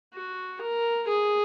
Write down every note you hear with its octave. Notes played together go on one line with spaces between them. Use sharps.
F#4
A#4
G#4